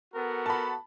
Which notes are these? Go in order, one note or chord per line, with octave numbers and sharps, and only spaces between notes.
B3 F#4 A4 A#4
A5 B5